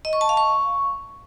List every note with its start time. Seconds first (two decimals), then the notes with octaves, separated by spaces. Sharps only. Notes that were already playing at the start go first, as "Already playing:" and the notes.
0.05 D#5
0.13 C#6
0.21 A5
0.29 F5
0.37 C#6